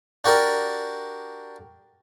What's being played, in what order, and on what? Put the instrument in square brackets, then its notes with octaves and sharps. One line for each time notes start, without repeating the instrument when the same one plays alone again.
[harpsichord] D4 F#4 G4 A#4 D5